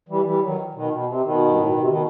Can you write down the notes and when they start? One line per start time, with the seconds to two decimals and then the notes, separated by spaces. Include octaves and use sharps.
0.09 E3 G3
0.25 E3 G3
0.41 D#3 F#3
0.74 B2 D#3
0.91 B2
1.07 C3
1.24 B2 D#3
1.45 G2
1.56 A2
1.66 B2
1.78 C3
1.87 B2 D#3